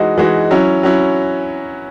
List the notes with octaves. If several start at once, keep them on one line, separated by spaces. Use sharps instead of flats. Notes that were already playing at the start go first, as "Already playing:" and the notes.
Already playing: E3 G#3 D#4 F#4
E3 G#3 D#4 F#4
F#3 C#4 E4
F#3 C#4 E4